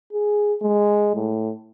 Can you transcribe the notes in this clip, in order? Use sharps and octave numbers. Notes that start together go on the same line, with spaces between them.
G#4
G#3
A2